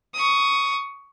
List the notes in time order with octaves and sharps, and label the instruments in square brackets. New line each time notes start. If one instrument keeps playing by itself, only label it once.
[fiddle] C#6 D#6